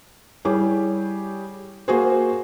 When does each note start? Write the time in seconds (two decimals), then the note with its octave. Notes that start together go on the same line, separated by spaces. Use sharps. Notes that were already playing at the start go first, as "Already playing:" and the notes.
0.45 G3 E4 G4 G#4 C#5
1.88 A#3 F#4 G#4 C5